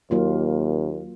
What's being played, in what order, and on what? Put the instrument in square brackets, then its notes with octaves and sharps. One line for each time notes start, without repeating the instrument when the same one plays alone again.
[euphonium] D#2 [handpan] F#3 A#3 F4